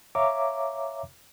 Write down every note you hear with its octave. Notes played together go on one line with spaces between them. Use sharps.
C#5 E5 F5 A#5 D6